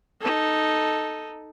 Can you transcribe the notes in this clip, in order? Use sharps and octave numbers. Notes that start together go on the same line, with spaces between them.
D#4 A4